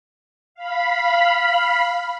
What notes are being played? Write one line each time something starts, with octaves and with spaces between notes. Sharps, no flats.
F5 B5